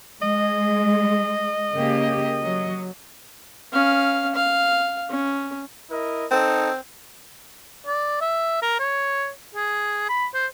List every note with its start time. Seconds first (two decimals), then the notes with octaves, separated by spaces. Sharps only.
0.22 G#3 D#5
1.75 C#3 A#3 G4
2.42 F#3
3.72 C#4 F5
4.35 F5
5.10 C#4
5.91 E4 A#4 D#5
6.31 C4 D#4 A4
7.87 D5
8.21 E5
8.62 A#4
8.79 C#5
9.54 G#4
10.09 B5
10.34 C5